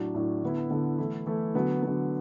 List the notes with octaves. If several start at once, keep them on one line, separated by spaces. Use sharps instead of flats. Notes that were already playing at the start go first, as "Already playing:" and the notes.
Already playing: A2 F#3 D4
A2 F#3 D4
D3 B3 E4
D3 B3 E4
E3 A3 E4
E3 A3 E4
D3 F#3 B3
D3 F#3 B3